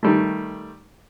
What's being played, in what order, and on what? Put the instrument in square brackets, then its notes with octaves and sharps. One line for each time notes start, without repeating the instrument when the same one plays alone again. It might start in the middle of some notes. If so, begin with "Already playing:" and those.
[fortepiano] D#3 G3 A3